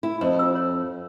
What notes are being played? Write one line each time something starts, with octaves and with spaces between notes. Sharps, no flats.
E4
F2 C5
F4 E6
C#5